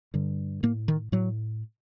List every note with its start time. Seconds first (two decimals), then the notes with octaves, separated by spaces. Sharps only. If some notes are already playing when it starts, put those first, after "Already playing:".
0.14 G2 D3
0.63 A2 A#3
0.88 D#3
1.12 A2 F#3